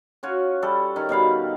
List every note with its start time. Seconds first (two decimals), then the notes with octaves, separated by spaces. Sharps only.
0.23 C#4 F4 F#4 C#5
0.62 G3 A4
0.96 D#3 C#4
1.09 B2 G3 F5 B5